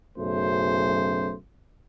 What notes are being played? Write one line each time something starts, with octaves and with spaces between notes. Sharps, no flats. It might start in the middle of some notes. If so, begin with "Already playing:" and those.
B1 F#2 C#3 A3 C5